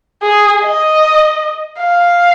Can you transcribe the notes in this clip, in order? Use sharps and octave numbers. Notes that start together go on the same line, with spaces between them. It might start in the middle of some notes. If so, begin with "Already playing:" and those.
G#4
D#5
F5